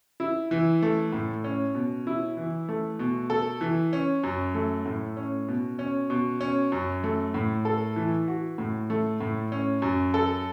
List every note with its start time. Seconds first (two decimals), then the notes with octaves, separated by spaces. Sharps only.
0.20 E4
0.51 E3
0.82 A3
1.13 A2
1.44 C#4
1.75 B2
2.07 E4
2.37 E3
2.69 A3
2.99 B2
3.30 A4
3.61 E3
3.93 C#4
4.24 F#2
4.54 A3
4.85 A2
5.17 C#4
5.48 B2
5.79 C#4
6.10 B2
6.41 C#4
6.72 F#2
7.04 A3
7.34 A2
7.65 A4
7.96 E3
8.28 F#4
8.58 A2
8.90 A3
9.21 A2
9.52 C#4
9.82 F#2
10.14 A4